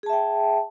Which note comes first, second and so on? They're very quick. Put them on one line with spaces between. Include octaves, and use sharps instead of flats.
G#4 A5 E5 G5